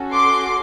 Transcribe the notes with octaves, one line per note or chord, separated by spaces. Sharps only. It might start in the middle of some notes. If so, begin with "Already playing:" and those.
Already playing: C#4 F#4 A4
C6 D6